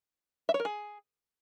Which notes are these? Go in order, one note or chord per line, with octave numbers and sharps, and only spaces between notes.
E5
C#5
A#4
G#4